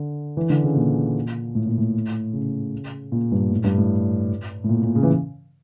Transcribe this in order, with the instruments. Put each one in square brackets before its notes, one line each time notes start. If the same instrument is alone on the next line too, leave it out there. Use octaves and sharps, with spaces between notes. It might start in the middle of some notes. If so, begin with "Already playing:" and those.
Already playing: [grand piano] D3
E3
D3
C#3
A#2
A2
A#2
A2
C#3
A#2
G2
A2
G2
A2
A2
A#2
A#2
C#3
E3